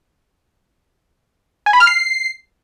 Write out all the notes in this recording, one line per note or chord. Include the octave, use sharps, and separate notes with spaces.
G#5
B5
F6
C7